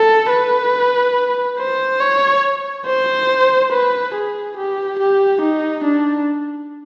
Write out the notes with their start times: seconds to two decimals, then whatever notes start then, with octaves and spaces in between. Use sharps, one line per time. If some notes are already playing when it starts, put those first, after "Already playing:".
Already playing: A4
0.30 B4
1.59 C5
2.00 C#5
2.85 C5
3.72 B4
4.14 G#4
4.57 G4
4.99 G4
5.41 D#4
5.84 D4